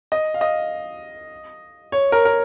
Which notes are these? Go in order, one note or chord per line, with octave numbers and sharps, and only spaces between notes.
D#5
F5
D#5
C#5
A#4
A#4